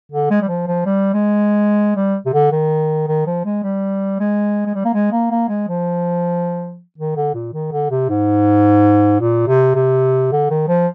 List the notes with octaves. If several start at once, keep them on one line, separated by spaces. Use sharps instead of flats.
D3
G#3
G3
F3
F3
G3
G#3
G3
C3
D3
D#3
D#3
F3
G#3
G3
G#3
G#3
G3
A#3
G#3
A#3
A#3
G#3
F3
D#3
D3
A#2
D#3
D3
C3
G#2
A#2
C3
C3
D3
D#3
F3